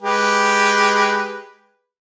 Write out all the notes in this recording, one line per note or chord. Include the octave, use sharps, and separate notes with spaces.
G#3 G4 B4